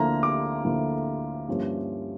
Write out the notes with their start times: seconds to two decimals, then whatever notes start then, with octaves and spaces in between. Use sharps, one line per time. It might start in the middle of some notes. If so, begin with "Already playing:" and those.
Already playing: D2 D3 F3 A#3 E4 A#5
0.23 D6
0.65 D2 D3 F3 A#3 E4
1.48 G2 F3 A#3 C#4 E4